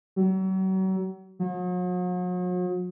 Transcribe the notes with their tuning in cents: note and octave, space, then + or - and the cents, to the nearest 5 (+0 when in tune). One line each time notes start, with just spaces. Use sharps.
F#3 +40
F#3 -45